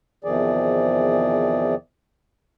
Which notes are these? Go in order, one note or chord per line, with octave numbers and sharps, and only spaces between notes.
E2 C3 D#3 F3 G#4 D5